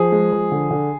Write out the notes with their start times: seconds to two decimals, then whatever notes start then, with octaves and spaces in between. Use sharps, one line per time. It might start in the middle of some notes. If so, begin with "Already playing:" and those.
Already playing: F3 G#4
0.12 G#3
0.32 F3
0.52 D3
0.71 D3